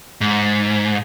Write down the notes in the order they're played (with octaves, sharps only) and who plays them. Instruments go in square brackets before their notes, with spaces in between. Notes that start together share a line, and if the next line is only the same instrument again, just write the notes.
[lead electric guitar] G#2